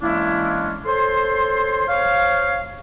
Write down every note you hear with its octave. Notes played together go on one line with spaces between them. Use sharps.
E3 G#3 A#3 C#4 D4 E4
A4 C5 C#5 C6
C5 C#5 F5